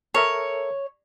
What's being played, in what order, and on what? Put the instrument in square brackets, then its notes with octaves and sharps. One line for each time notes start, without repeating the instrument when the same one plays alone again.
[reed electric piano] A4 A#4 E5 [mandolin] C#5